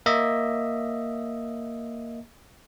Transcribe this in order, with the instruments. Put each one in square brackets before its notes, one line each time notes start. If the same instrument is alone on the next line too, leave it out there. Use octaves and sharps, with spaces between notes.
[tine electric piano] A#3 D#5 E5